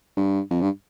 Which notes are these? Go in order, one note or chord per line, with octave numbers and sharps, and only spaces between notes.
G2
F2
G2